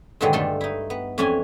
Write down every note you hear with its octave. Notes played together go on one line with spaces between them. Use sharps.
G2 A#2 D3 D#3 F#3 G#3
G2 A3 F4 A4 C6
D#4 E4
B3
F2 E3 C#4 D4 E4 G#5